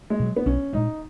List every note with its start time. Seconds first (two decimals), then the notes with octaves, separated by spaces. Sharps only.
0.10 G#3
0.20 B2 F#3
0.36 B3
0.46 B1 C#4
0.73 A#2 G#3 C#4 D#4